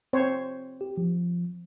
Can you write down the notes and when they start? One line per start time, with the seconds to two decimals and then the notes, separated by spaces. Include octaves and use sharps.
0.13 C4 C5 C#5
0.81 G4
0.97 F3